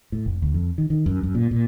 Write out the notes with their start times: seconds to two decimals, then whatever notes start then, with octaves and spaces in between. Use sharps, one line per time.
0.12 A2
0.26 F1
0.42 D2
0.54 F2
0.78 D#3
0.90 D#3
1.06 F#2
1.23 F#2
1.35 A#2
1.51 A#2